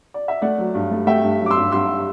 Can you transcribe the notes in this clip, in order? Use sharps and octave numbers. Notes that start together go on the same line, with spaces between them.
D5
E5
A3 D5 F#5
F#3
G2
A3
A3 E5 G5
G2
F#3
D6
C6 E6
G2
G2 C6 E6